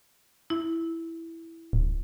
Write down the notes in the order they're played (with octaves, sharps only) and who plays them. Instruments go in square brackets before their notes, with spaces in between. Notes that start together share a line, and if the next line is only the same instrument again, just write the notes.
[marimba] E4
[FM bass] D1